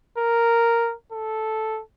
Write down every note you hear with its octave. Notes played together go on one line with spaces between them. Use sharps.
A#4
A4